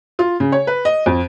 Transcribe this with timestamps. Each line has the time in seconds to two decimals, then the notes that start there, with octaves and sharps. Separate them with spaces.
0.19 F4
0.40 C#3
0.52 C#5
0.67 B4
0.85 D#5
1.06 F2